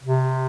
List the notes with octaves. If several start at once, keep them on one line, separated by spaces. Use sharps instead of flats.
C3